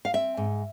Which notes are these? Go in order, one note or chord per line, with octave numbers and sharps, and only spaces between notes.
F5
C4 E5
G#2